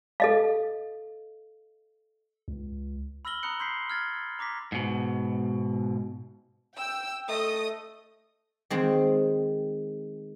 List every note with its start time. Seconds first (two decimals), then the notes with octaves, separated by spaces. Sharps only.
0.20 A4 D#5 F5
2.48 C#2
3.25 B5 E6 F6 A#6 F#7 G7
3.43 A#5 B5 D#6 F#6 C#7
3.60 C6 G6 B6 C7
3.90 F6 G#6 A6
4.39 A#5 D6 A#6 B6
4.72 G#2 B2
6.75 G5 E6
7.29 A3 D#5 D#6
8.70 D#3 G#3 C4